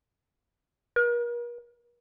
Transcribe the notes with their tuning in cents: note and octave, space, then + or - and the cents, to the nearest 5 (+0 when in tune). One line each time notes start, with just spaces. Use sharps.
A#4 +45